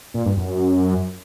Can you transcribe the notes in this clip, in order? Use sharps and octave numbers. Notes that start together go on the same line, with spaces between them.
A#2
G2
F#2